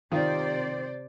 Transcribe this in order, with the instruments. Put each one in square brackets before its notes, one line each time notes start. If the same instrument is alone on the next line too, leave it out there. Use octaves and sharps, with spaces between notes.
[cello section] C3 C5 D5 [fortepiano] D#3 F4